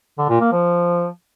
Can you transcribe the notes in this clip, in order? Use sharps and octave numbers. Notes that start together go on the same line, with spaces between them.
D3
A#2
A#3
F3